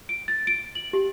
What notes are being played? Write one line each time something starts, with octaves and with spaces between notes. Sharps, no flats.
D7
A6
D7
F#7
G4